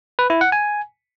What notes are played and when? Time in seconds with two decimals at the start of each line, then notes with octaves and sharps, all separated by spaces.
0.19 B4
0.30 E4
0.41 F#5
0.52 G#5